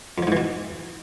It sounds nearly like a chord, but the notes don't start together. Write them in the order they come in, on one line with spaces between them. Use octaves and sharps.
F2 F3 G#2 E3 B2